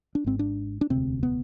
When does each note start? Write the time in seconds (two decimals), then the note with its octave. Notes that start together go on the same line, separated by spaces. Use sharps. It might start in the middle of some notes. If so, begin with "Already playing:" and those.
0.15 D4
0.24 G#1 G#2 C4
0.39 D4
0.81 D4
0.90 E1 D2 C3 C4
1.23 B3